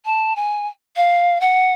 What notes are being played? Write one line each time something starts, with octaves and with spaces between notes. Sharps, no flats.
A5
G#5
F5
F#5